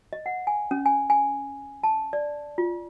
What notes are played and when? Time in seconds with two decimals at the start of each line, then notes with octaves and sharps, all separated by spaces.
0.13 D#5
0.26 F#5
0.47 G#5
0.71 C#4
0.86 G#5
1.10 G#5
1.83 A5
2.13 D5
2.58 F4